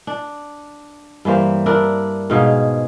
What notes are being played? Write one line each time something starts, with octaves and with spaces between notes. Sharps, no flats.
D4
G2 E3 A#3 C5
D4 E4 A#4
G#2 B2 G#4 F5